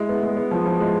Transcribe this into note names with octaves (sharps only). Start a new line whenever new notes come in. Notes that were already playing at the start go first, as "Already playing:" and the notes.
Already playing: G#3 E4
B3
G#3
B3
F3
F3
G#3